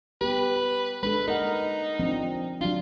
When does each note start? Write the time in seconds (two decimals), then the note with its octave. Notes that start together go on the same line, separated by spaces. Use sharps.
0.21 B3 G4 B4
1.03 G#3 D4 A4 B4
1.28 D#4 A#4 F#5
1.99 F3 C4 D4
2.61 F#3 D4 F4